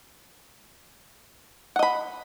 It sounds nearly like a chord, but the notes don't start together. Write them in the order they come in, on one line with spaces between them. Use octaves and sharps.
F#5 D#5 B5